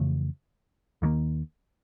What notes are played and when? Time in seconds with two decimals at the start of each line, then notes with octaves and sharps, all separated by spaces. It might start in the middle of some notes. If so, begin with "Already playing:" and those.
Already playing: F2 C#3 E3 A3
1.02 D#2 D#3 F#3 A#3